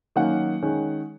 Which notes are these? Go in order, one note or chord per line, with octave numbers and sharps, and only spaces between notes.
D#3 F#3 A#3 C#4 F#5
D#3 G#3 C#4